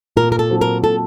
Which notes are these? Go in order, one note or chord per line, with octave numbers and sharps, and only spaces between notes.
A#2 A#4
A#4
A4
F#3 C4
A#4
A#2 A4